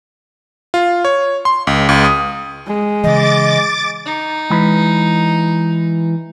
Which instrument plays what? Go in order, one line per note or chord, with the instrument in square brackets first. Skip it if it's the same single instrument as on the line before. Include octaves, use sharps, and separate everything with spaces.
[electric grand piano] F4
C#5
C6
C#2
C#2
D#6
[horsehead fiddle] G#3
[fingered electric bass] C#3 E3 [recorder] D#5 [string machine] D6 A6
[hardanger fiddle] D#4
[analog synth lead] E3 [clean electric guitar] G#3 B5